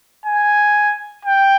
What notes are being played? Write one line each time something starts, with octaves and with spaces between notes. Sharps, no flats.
G#5
G5